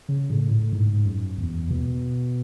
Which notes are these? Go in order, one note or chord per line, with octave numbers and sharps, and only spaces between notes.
C#3
A2
A2
G#2
F#2
E2
B2